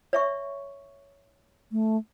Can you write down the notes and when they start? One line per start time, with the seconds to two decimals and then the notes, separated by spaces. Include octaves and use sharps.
0.13 C#5 E5 C#6
1.72 A3